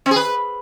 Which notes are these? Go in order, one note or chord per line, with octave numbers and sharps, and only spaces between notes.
C4
G#4
B4